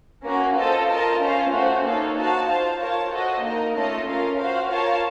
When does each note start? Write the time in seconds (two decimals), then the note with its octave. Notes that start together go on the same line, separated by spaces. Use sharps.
0.24 A#3 C#4 F#4 A#4
0.57 F4 A4 C5 D#5
0.88 F4 A#4 D#5 A5
1.21 C#4 F4 C5 F5
1.53 A3 C#4 F#4 C5
1.83 A#3 D#4 A4 C#5 F5
2.15 D#4 F#4 C5 F5 A5
2.47 F4 C5 F5 A5
2.80 F4 A#4 C#5 A5
3.11 F#4 A4 C5 D#5
3.42 A#3 D#4 A#4 D#5
3.75 A3 C#4 F4 A4 D#5
4.06 C#4 F4 A#4 F5
4.38 F#4 C5 F5
4.69 F4 A#4 C#5 F5 A5